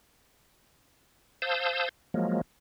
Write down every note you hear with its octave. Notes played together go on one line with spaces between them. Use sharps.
C5 F5 A5 D#6 E6 G6
F3 F#3 G#3 A#3